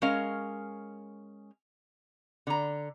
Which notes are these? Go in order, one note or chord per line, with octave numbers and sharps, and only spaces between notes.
G#3 C#4 A#4 F5
D3 A#5